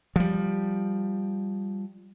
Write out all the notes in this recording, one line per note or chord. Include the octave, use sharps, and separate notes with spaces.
F3 G3